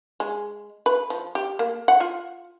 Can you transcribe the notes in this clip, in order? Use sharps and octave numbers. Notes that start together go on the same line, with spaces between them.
G#3
B4
F3
G4
A#3
F#5
F4